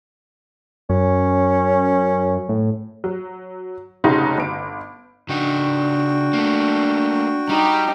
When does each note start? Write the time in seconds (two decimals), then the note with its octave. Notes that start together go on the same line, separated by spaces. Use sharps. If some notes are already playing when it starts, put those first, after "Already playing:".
0.90 F#2 C#4
2.49 A2
3.04 F#3
4.04 F1 C#3 D#4 F#4 C6
4.38 G1 D7
5.29 C#3 D4 D#4 F#4 G5
6.33 A3 A#3
7.49 G3 D#4 G4